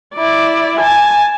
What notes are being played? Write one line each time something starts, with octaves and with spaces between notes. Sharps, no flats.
E4 D5
G#5 A5